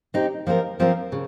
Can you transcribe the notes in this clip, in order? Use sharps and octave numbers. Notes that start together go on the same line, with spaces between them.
C4 D#4 G4
F3 C4 F4 A#4
F3 C4 F4 A#4
C#3